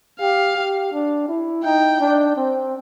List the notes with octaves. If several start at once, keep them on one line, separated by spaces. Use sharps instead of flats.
G4 F5
G4
D4
E4
D#4 G5
D4
C4